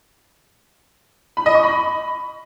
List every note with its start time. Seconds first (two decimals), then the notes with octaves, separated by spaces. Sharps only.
1.37 B5
1.46 D#5
1.55 C#6
1.64 B5